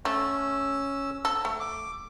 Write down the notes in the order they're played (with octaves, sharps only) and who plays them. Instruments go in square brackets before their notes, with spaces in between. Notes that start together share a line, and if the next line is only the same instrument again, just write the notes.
[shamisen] A3 [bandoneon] C#4 E6
[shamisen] A4
A3
[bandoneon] D6